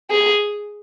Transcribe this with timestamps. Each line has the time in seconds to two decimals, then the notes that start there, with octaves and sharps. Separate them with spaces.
0.11 G#4